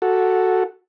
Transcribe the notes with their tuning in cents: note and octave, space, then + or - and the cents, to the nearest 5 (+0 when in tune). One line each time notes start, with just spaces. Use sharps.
F#4 +0 A4 +0